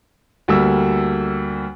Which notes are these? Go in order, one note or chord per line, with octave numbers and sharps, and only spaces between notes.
D2 G3 A#3 E6